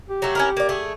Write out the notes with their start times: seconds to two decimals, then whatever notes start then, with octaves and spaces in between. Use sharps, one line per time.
0.09 G4
0.22 F#3 A3
0.35 C#4 E4 A#4
0.57 A#3 D5
0.69 A3 G#4